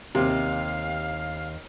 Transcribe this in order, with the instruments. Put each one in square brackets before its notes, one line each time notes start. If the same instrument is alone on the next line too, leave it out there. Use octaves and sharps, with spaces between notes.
[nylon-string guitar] D#2 [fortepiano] C3 [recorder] F5